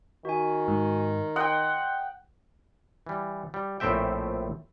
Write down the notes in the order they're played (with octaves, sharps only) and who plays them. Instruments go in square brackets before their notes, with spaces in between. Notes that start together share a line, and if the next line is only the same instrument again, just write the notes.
[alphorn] D#3 [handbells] F#4 G#5
[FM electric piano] G#2
[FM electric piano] D#5 [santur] F#5 G5 [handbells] C6
[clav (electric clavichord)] E3 G3
G3
A#1 A2 A3 C4 E5 G5